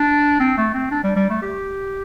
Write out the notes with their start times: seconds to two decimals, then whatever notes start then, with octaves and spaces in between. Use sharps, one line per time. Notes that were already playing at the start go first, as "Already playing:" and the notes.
Already playing: D4
0.40 C4
0.58 A3
0.74 C4
0.91 D4
1.04 G3
1.16 G3
1.30 A3
1.42 G4